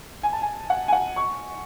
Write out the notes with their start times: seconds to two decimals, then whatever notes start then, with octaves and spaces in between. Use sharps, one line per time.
0.23 G#5
0.32 A5
0.42 G#5
0.70 F#5
0.88 G#5
0.93 F#5
1.16 C#6